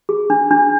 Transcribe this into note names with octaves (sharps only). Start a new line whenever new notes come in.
G#4
D4
D4